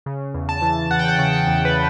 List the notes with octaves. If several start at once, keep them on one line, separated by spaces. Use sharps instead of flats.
C#3
E2
A5
E3
E2 F#5
G5
F#5
C#3
F#5
E2
B4